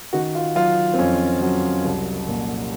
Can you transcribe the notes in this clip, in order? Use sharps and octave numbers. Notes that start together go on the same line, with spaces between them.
D#3 F#4
F4
F#3 F4
C4
F2 C#4
F#3
C2
A#2